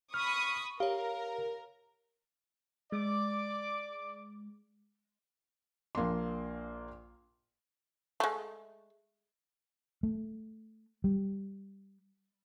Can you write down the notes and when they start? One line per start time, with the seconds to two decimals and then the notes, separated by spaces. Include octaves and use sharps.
0.14 B5 C#6 D#6 F6
0.80 G4 A#4 C#5 F5
2.92 G#3 D5 D6
5.95 A#1 A#3 D4 C6
8.20 G#3 A3
10.03 A3
11.04 G3